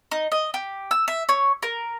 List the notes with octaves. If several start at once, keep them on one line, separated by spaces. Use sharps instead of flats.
D#4
D#5
G4
E6
E5
C#5
A#4